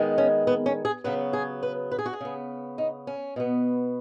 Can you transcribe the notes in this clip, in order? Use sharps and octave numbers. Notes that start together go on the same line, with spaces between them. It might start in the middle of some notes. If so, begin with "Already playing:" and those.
Already playing: D#3 G#3 B3
C#4
B3
C#4
G#4
C#3 F#3 B3 B4
G#4
B4
B4
G#4
F#4
G#4
C#3 B3
D#4
C#4
B2 B3